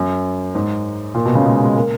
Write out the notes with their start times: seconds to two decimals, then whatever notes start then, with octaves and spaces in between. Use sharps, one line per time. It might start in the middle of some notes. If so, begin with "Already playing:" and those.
Already playing: F#2
0.55 G#2
1.14 A#2
1.25 B2
1.35 C#3
1.46 G#3
1.64 G#3
1.76 A#3